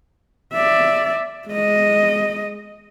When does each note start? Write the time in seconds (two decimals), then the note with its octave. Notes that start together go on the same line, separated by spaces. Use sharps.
0.54 D5 E5
1.48 G#3 D#5